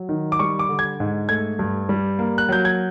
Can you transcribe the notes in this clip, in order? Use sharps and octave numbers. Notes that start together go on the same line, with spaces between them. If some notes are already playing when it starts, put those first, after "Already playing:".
Already playing: F#3
D#3
D6
G3 C#6
D6
D3
G#6
G#2
A3 G#6
G2
G3
A#3
F#6
F#3 G6
G#6